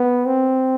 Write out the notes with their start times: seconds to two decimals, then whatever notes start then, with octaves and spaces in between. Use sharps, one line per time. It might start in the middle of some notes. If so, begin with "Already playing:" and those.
Already playing: B3
0.26 C4